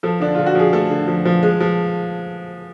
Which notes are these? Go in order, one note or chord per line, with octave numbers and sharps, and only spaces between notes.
F3 A4
D3 D4
D3 F4
F#4
F3 G#4
A3 A4
D3
F3
F3
G#3
F3